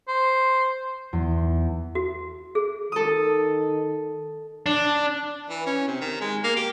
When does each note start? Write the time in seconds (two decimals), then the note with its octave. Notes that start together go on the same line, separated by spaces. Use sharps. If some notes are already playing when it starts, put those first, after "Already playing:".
0.08 C5
1.13 E2
1.95 F#4
2.55 G#4
2.92 D#3 A4 D#6
4.66 D4
5.50 E3
5.66 C#4
5.87 C3
6.01 D#3
6.21 G#3
6.44 A#3
6.56 G4